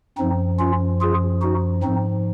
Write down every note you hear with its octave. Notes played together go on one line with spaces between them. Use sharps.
F#2 F3 C4 D#4
C#4 F4
F4 G#4
D#4 F#4
G#2 F3 C4 D#4